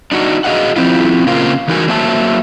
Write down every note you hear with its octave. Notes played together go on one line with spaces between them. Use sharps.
D4 D#4 F#4
F#4 G#4 D#5 F5 F#5
F3 C4 E4 F4
C#3 A#3 C4 F4
E2 E3 D#4 F#4 A#4 G#5
F#3 A#3 C5 E5 A5